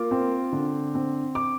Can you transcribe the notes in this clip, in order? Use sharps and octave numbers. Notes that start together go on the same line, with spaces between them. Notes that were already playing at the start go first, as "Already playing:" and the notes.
Already playing: A#3 F4 D6
C4
D3
C4
D6